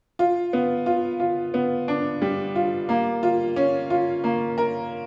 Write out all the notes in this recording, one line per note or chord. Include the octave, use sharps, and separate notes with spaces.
F4
B3
F4
F4
B3
D4
G3
F4
A#3
F4
C#4
F4
A#3
A#4